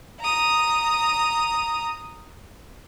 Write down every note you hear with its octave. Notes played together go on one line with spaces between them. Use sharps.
A#5 D#6